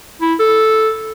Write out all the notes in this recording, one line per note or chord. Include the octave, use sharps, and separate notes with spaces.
E4
A4